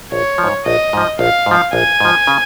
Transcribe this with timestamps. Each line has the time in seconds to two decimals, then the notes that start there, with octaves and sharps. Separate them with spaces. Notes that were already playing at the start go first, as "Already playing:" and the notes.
0.12 A#1 C#5
0.38 F3
0.43 G#2
0.66 A#1 D#5
0.93 G#2 F3
1.19 A#1 F5
1.46 G#2 F3
1.73 A#1 G#5
2.00 G#2 F3
2.27 C#3